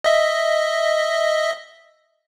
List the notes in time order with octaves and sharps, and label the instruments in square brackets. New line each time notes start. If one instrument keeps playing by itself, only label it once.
[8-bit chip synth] D#5 E5